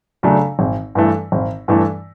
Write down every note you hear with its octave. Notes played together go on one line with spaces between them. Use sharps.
C#3 F#3 A3 D4
G#1
G2 E3 A3
G#1
G2 E3 A3